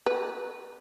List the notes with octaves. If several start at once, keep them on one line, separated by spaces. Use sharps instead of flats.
B4